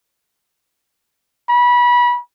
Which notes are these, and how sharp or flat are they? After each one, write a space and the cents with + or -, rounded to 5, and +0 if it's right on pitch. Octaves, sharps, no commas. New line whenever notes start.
B5 -25